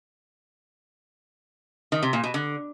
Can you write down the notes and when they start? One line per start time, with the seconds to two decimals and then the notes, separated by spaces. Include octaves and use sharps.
1.92 D#3
2.03 C3
2.13 A#2
2.24 B2
2.34 D3